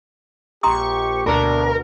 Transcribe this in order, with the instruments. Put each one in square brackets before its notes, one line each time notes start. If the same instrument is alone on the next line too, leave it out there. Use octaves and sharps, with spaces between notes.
[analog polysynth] A#1 C#6 [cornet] G4 [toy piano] A#5 C6 D#6
[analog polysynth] D2 B2 [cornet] D4 [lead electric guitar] A#4